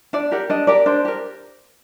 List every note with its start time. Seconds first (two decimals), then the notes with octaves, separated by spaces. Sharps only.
0.13 D4 D5
0.31 G4 A#4 F#5
0.50 D4 D#5
0.67 G4 A#4 D5
0.86 D4 C5
1.05 G4 A#4